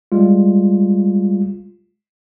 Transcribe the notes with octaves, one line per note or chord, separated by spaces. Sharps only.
G3 G#3 F4